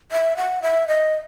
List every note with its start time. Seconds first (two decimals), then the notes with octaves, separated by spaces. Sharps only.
0.12 E5
0.37 F#5
0.62 E5
0.88 D#5